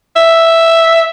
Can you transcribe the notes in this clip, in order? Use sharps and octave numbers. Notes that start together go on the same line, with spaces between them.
E5